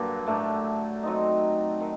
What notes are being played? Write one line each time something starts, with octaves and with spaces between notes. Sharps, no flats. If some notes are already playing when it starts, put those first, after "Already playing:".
Already playing: G2 D3 F#3 A#3
A2 A3 D4
F#3 C4 D#4
D#3